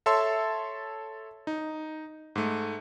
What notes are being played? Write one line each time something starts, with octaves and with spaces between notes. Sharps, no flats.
A4 C#5 E5 A5 C6 E6
D#4
G#2 A3